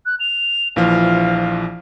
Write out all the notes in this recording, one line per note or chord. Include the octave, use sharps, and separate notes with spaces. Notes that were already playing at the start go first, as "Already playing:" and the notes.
F#6
F7
A#1 E3 F3 F5